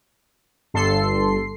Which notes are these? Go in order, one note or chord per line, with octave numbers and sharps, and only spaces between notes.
G1 G2 A4 C6 C7